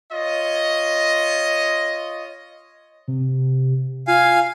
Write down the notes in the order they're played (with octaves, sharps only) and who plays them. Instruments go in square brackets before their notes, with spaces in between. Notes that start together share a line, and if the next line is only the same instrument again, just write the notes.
[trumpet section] F4 C#5 D#5
[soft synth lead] C3
[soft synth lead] F4 [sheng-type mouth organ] F5 G#5